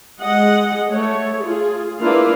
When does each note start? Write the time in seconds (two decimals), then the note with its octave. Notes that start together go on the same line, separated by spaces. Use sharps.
0.20 G#3 G#4 D#5 F#5
0.90 A3 C#5
1.38 F4 G#4
2.00 A#3 D4 E4 F4 B4 F5